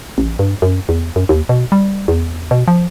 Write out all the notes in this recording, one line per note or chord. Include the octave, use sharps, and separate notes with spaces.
A1
G2
F#2
E2
F#2
D#2
B2
G3
E2
B2
F3